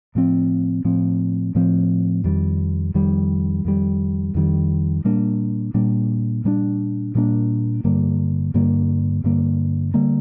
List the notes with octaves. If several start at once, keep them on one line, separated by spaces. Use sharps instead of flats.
A2 F3 C4
A2 F3 C4
A2 F3 C4
F2 D#3 G3
F2 D#3 G3
F2 D#3 G3
F2 D#3 G3
A#2 G3 A#3 D4
A#2 G3 A#3 D4
A#2 G3 A#3 D4
A#2 G3 A#3 D4
G2 D3 G3 A#3
G2 D3 G3 A#3
G2 D3 G3 A#3
D3 G3 A#3